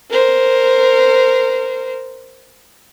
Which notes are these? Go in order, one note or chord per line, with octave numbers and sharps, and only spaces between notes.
A#4 C5